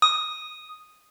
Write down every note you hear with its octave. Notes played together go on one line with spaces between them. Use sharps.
D#6